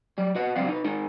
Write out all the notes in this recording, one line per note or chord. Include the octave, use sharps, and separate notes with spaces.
F#3 G3
F#4 B4 D#5 F#5
C#2 F#3 G3 C4 G4 F5
D#4 B4
G#3 D#4 A#4